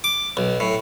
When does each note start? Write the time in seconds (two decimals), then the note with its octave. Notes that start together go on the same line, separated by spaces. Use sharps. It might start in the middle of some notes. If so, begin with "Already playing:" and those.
0.04 D6
0.37 B1
0.60 A2